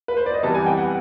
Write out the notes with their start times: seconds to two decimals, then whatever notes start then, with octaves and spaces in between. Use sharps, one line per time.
0.08 B4
0.17 C5
0.26 D5
0.34 D#5
0.43 C3 E3 G3 B3 A5
0.55 G#5
0.66 G5
0.77 F#5